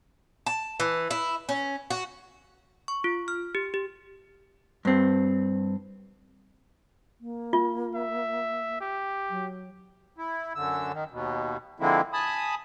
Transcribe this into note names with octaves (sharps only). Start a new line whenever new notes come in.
A5
E3
E4
C#4
F#4
C#6
F4
F6
G4
G4
G2 C4
A#3
F4
E5
G4
F#3
E4
F#2 D3 E6
D#3
D#2 B2
D3 F3 G#3 A#3 C4 E4
G#5 A5 B5 D#6